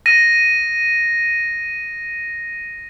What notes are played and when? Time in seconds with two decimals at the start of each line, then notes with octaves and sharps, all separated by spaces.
0.06 A#6 D#7